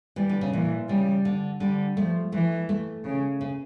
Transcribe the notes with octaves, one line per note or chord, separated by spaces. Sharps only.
E3 G3
D3
C#3
A#2 E3
C#3 G3
D3
D3 G3
F3 A3
E3 A3
A3
C#3
C#3